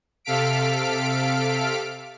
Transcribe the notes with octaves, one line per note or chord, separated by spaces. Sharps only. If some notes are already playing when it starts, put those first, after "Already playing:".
C3 A4 F5 F6 B6 D7